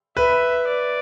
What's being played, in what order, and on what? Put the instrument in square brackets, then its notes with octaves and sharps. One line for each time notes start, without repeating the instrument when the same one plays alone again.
[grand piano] B4 [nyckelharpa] E5
[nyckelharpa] D5